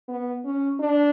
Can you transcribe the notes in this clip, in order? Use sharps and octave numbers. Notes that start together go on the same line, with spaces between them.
B3
C#4
D4